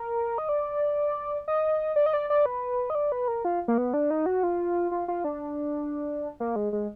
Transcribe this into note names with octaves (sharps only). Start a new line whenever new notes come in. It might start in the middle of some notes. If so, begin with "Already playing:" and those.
Already playing: A#4
D#5
D5
D#5
D5
D#5
D5
D5
B4
D#5
D5
B4
A#4
F4
A#3
B3
D4
D#4
F#4
F4
F4
F4
D4
A#3
G#3
G#3